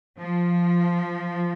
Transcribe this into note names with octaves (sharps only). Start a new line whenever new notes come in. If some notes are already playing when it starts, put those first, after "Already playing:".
F3